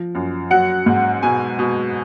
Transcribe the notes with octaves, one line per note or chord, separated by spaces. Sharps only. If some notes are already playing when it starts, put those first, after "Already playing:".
Already playing: F3
F#2
F#3 F#5
G#2
B2 G#5
B2